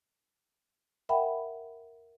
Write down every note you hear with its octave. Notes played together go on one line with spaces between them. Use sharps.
A#4 E5 F#5 G5 B5